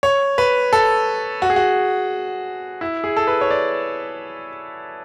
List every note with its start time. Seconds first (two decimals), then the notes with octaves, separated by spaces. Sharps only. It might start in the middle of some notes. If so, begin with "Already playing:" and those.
0.03 C#5
0.38 B4
0.73 A4
1.42 F#4
1.50 G#4
1.56 F#4
2.81 E4
3.04 G#4
3.17 A4
3.27 B4
3.41 C#5
3.51 D5